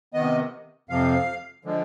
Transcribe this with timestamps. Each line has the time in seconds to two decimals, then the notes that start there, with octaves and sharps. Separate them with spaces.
0.14 C3 D#3 B3 D#5
0.89 F2 C3 F3 F5
1.65 D3 F3 G#3